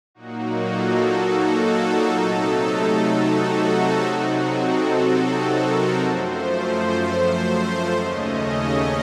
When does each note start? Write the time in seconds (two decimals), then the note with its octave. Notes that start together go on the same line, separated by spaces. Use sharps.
0.15 A#2 F#3 A#3 D#4 F#4
0.64 A4
1.12 A4
1.61 F#4
2.09 C3 F#3 A3 D#4 A4
3.07 F#4
3.56 A4
4.04 C3 F#3 C4 D#4 F#4
4.53 A4
5.02 A4
5.51 A#4
5.99 F#2 F3 A3 C5
6.48 C5
6.96 C5
7.95 D#2 C#3 A3 C#4 D#5